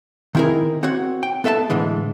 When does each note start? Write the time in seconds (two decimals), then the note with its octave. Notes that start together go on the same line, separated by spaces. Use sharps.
0.35 D#3 C4 E4 G#4 A#4
0.83 C4 F#4 C#5 F#5
1.23 G5
1.44 B3 A4 E5 F5 A5
1.70 A2 D3 E3 G#3